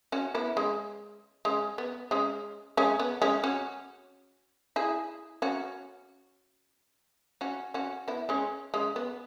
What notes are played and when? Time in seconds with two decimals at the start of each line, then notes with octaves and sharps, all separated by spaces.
0.12 C#4 F#4
0.35 B3 E4
0.57 G#3 C#4
1.45 G#3 C#4
1.78 B3
2.11 G#3 C#4
2.77 G#3 C#4
2.99 B3
3.22 G#3 C#4
3.44 C#4 F#4
4.76 E4 G#4
5.42 C#4 F#4
7.41 C#4 F#4
7.74 C#4 F#4
8.08 B3 E4
8.29 G#3 C#4
8.74 G#3 C#4
8.96 B3